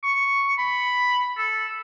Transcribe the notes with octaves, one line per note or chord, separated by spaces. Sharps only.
C#6
B5
A4